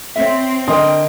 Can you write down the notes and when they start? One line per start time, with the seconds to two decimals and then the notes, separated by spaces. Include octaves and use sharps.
0.16 C4 C#5 E5
0.68 D3 A#4 D#5 G5 C6